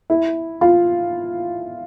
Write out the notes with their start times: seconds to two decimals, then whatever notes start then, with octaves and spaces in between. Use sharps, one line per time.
0.10 E4
0.61 F4